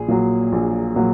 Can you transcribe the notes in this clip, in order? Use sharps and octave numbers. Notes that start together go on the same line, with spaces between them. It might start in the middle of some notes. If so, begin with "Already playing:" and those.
Already playing: A#1 G#4
A#2 F#3
A#1
A#2 F#3